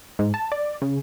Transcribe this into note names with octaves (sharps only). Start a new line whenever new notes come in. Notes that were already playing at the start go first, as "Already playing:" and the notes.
G#2
A5
D5
C#3